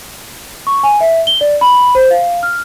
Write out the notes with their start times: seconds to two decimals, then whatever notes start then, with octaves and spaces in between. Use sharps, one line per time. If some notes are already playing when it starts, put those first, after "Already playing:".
0.67 C#6
0.83 G#5
1.01 E5
1.27 G7
1.41 D5
1.61 B5
1.95 C5
2.11 F5
2.43 F6